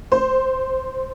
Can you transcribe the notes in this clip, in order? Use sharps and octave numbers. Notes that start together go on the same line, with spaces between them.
C5